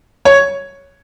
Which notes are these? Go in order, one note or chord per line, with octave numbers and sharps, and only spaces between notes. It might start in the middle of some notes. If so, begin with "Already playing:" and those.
C#5